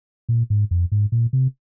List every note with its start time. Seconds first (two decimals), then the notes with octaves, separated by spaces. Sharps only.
0.29 A#2
0.50 G#2
0.71 F2
0.92 G#2
1.12 A#2
1.33 C3